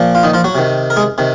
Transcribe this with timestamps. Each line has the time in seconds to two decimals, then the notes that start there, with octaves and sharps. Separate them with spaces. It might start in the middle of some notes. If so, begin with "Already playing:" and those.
Already playing: A#2 F3
0.15 F4
0.23 D#3 D#4
0.34 F3 F4
0.44 F#3 F#4
0.55 C3 D#3
0.90 A#4
0.96 G#3 G#4
1.18 C3 D#3